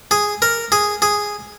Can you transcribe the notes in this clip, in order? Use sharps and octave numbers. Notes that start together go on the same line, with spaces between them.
G#4
A#4
G#4
G#4